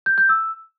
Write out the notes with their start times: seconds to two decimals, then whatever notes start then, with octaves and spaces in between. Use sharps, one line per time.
0.06 G6
0.18 G6
0.29 E6